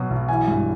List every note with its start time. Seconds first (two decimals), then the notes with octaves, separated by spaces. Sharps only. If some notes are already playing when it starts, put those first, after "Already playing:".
Already playing: B2 F#3
0.10 B1
0.29 E3 G#5
0.48 G2